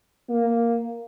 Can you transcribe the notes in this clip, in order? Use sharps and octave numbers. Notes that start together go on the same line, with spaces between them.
A#3